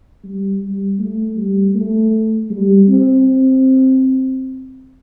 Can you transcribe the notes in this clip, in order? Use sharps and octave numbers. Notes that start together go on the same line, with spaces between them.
G3
G3
A3
G3
A3
G3
C4